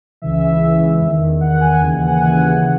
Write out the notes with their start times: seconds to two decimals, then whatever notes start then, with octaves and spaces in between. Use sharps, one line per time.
0.22 C#2 C#3 E3 E5
0.41 E5
0.61 C#2 C#3 E3
1.01 E2 D#3
1.41 E2 D#3 F#5
1.61 G#5
1.80 D#2 C#3 E3 G#5
1.94 F#5
2.07 G#5
2.20 D#2 C#3 E3 F#5
2.61 C#3 E3